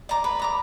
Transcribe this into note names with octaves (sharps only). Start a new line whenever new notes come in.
D5 A#5 D6
B4
D5 A#5 D6